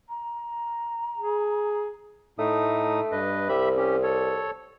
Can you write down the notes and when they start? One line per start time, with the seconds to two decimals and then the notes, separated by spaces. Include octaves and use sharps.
0.09 A#5
1.18 G#4
2.39 A2 A3 D#4 D#6
3.12 G2 B4 D#5
3.49 C2 G4 E5 B5
3.77 C#4 G4
4.03 A4 C#5